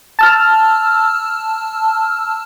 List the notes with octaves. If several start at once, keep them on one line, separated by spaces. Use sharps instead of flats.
A5 E6 F6